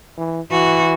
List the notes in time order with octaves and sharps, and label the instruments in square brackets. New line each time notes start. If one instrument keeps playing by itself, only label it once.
[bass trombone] E3
[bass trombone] E3 [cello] F#4